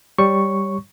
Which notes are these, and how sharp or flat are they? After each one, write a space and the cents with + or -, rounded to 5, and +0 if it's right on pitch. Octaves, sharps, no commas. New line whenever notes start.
G3 +0 C#5 +0 C#6 +0